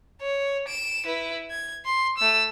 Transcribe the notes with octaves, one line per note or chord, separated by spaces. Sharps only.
C#5
D7 E7
E4 B4
G#6
C6
A3 E6